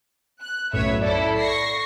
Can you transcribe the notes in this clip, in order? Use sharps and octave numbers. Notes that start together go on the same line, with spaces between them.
F#6
B1 F#2 A2 B4 C#5 E5
E4 A4 D5
C#6 A#6 C7